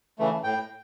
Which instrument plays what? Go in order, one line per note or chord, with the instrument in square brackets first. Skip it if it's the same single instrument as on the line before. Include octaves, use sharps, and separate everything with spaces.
[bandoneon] C#3 E3 A3
A2 G5